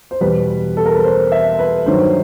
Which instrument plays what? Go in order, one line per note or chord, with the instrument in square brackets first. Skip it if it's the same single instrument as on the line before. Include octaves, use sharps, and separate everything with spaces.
[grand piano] C5
E2 B2 G3 B4
A4
A#4
B4
C5
E5
B4
G2 D#3 F#3 C5